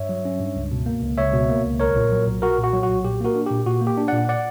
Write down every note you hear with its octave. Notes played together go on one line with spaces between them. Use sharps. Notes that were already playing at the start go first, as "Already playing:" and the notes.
Already playing: G2 C#5 E5
F#3
C#4
G2
C#2
B2
A#3
C#2
C#2 C#5 E5
B2
A#3
C#2
B1 A#4 C#5
A#2
F#3
B1
B1 F#4 A#4
A#2
F#4
F#3
F#4
B1
A#2 G4
A#3 F#4 A#4
D4
A#2 G4
A#2 F#4
A#3
G4
D4
A#2 D5 F#5
D5 F#5